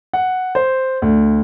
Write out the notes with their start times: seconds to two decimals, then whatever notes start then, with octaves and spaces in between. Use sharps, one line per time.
0.13 F#5
0.55 C5
1.02 D2